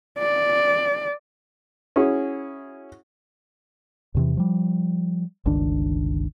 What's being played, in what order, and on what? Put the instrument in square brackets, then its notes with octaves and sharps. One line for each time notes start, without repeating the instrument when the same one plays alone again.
[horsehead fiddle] D5
[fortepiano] C#4 E4 F#4 G#4
[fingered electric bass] E2 C3 E3
F3 G3
G1 C#2 D#3 D4